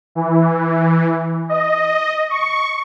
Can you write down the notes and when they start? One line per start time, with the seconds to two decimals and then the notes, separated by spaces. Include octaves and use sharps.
0.15 E3
1.49 D#5
2.30 C#6